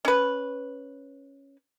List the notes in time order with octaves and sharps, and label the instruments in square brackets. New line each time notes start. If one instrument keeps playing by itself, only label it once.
[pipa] C#4 B4